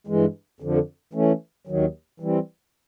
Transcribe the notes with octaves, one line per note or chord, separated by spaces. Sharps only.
G2 E3 G#3
F2 D3 F3
E3 A3 C#4
D#2 D#3 F#3
E3 G3 C4